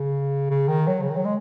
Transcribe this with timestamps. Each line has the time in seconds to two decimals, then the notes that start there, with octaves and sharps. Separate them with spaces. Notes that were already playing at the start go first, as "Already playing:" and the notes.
Already playing: C#3
0.50 C#3
0.68 D#3
0.87 F#3
1.02 C#3
1.10 D#3
1.16 F#3
1.25 G#3